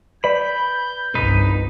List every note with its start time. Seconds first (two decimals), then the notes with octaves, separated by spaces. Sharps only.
0.24 B4 D5 B5 G6
1.15 G1 C2 D#4 B4